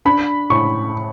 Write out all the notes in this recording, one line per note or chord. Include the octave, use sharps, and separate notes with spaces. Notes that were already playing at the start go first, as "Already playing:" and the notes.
D4 B5
A2 C#6